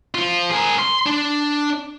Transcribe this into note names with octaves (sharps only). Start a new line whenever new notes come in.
F3 F4
G#4 A#4
C6
D4